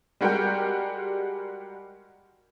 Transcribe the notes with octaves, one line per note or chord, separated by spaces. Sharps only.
G3 G#3 F#4 G4 A#4 G5